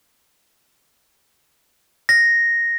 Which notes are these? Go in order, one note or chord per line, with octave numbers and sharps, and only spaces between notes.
A#6